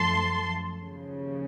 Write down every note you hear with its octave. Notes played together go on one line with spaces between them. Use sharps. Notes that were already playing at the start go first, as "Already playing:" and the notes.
Already playing: F#2 F3 A3 A5 C6
D#2 C#3 F3